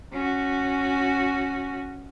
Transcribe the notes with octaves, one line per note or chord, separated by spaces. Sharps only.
C#4 F#4